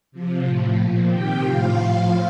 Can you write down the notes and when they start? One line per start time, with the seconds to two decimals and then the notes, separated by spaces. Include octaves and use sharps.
0.12 C3 F3
0.44 A2 F3
0.77 A#2 F3
1.09 C3 D#3 G4 G5
1.41 A2 F3 F4 F5
1.74 A2 F3